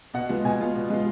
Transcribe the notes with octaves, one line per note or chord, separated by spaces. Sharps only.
B2 F#5
G#3 B3 F4
B2 G#5
G#3 B3 F4
B2
G#3 B3 F4